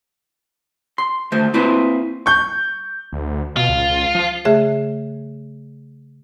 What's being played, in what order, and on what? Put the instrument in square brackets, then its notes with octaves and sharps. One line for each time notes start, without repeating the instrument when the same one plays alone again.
[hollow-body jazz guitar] C6
D2 A3 C5
A#3 C4 E4 B4 C5
[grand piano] C#6 G6
[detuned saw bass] D2
[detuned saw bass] B2 [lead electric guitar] F4
[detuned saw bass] C#2
F3
[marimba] C#3 A3 G#4 E5 F#6